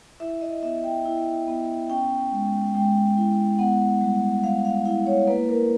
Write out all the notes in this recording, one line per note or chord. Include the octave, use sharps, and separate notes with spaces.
E4 E5
D#5
B3 E5
G5
E4
B3
C#4 G5
G#3
G#3 G5
E4
B3 F#5
G3
G3 F5
F5
E4 F5
C#5
A#3 B4
A#4